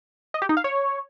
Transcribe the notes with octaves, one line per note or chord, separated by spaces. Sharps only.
D#5
G4
D#4
F5
C#5